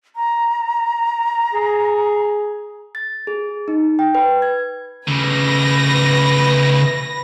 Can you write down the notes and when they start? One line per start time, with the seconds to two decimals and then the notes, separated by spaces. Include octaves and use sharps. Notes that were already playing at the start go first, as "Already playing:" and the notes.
0.16 A#5
1.53 G#4
2.95 A6
3.27 G#4
3.68 D#4
3.99 G5
4.15 B4
4.42 G#6
5.08 C#3 A3 B4 A#6